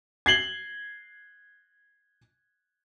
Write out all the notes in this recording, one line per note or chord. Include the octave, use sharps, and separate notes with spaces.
G#6 C7 F#7 G7